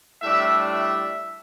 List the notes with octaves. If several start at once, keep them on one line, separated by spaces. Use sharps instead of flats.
A2 G3 D4 E5
E5